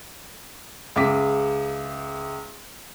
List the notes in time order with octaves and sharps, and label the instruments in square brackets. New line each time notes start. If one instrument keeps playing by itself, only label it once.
[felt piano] C#2 G#4 E5 D6 B6